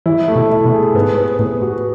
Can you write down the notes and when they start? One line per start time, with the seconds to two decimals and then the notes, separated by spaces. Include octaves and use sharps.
0.06 E3 E4
0.28 A3
0.36 B2
0.51 E4
0.65 B2
0.73 G#4
0.95 G#2 B3
1.17 B3
1.39 A2 B3
1.62 F#4